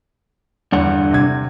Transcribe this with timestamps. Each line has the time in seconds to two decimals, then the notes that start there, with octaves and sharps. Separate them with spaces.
0.72 E2 G2 D3 F#5
1.11 C3 G#6